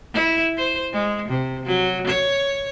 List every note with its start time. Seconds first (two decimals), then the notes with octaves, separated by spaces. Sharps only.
0.13 E4
0.57 C5
0.92 G#3
1.29 C3
1.65 F#3
2.07 C#5